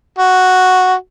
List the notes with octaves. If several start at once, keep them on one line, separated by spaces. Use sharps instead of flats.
F#4